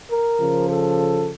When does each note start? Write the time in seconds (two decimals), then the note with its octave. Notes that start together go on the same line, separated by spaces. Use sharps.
0.11 A#4
0.40 C#3 F3
0.68 A4